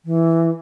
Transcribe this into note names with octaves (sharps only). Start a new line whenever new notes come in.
E3